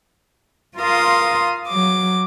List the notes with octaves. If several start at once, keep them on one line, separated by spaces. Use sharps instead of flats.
F4 A#4 F5 C6 D#6
F#3 D6